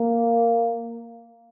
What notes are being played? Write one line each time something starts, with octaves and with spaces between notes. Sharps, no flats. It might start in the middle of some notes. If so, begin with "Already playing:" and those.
Already playing: A#3